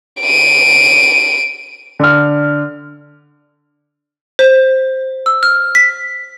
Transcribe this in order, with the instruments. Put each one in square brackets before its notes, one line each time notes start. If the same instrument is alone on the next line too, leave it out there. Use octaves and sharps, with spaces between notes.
[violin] D7 D#7
[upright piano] D3 F6
[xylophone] C5
E6
F6
B6